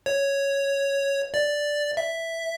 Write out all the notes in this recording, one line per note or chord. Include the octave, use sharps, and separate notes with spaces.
C#5
D5
E5